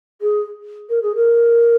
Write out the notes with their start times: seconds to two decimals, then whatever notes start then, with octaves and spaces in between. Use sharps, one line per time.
0.21 G#4
0.89 A#4
1.02 G#4
1.15 A#4